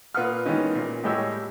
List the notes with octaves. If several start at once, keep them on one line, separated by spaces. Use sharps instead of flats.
A#2 B4 F5 F#5 D#6 F6
D#3 E3 G#3 B3 C#4 D#4
A#2 A#3
A2 G3 G#3 G4 C#5 E6